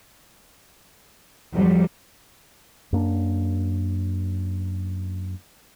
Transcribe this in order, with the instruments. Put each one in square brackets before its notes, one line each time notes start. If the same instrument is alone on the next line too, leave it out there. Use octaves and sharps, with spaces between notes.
[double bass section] F2 [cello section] F#3 G3
[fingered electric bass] F#2 A#3 D4